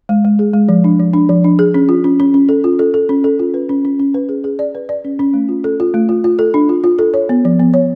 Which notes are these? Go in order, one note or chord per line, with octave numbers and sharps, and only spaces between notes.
G#3
G#3
G#4
G#3
F3
D4
F3
D4
F3
D4
G#4
C#4
F4
C#4
C#4
C#4
A4
F4
A4
A4
C#4
A4
F4
B4
C#4
C#4
C#4
B4
G#4
G#4
D5
B4
D5
C#4
C#4
A3
F4
A4
F4
A3
F4
F4
A4
D4
F4
F4
A4
C#5
B3
F3
B3
C#5